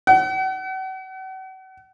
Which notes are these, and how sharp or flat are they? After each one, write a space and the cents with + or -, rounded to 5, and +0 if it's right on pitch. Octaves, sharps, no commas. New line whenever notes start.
F#5 +40